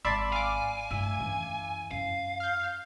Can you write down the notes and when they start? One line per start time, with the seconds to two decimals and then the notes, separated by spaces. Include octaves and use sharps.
0.05 G#1 D5 E5 A5 B5 C6
0.32 F5 G#5 D6
0.91 G2 A3 E4
1.20 F#2 E3
1.91 F#2 F5
2.40 F6 G6